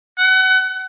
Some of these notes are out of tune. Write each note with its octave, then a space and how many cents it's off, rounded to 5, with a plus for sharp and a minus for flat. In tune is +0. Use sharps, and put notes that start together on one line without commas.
F#5 +30